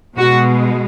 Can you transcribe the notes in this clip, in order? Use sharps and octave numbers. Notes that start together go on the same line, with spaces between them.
B2 G#3 F#4